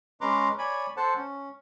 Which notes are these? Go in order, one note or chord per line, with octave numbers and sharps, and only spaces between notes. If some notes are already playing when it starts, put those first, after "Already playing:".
G#3 C#4 B4 A#5 C6 D6
C#5 D5 G#5 B5
A4 C5 F#5 A5
C#4